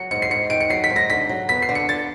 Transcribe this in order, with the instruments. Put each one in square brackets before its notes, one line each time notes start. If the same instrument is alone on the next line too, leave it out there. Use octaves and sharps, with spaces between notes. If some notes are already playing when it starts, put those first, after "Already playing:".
Already playing: [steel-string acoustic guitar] F#3 [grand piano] C#7
[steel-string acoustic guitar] G#2 [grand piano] C#7
[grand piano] C7
[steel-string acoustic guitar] G#2 [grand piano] C#7
[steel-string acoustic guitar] D#3 [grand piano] D7
[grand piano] C#7
[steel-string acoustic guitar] F#3 [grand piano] C7
[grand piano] B6
[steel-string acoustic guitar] G#2
[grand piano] A#6
[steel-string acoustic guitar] D3 [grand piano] B6
[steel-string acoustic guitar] F#3
[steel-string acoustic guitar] B3 [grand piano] B6
[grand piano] C7
[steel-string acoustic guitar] D3
[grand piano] C#7
[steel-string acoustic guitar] D3 [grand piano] A6